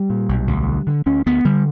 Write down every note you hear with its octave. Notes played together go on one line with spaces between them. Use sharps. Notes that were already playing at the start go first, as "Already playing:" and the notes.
Already playing: G3
A#2
B1
D2
D3
D3
D2 C#4
D2 B3
D3 G3